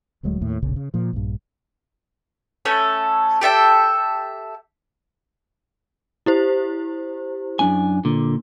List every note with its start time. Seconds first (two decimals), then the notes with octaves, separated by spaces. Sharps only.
0.23 D#1 D2 F#3 G#3
0.41 D#2 A2
0.62 E1 A#1 C#3
0.76 C#3
0.94 A#2 F3
1.13 A#1 G2
2.65 A3 C#4 A4 C#5
3.41 G4 A4 E5 G5
6.26 E4 G4 C5
7.59 F#2 D4 G#5
8.05 A#2 D3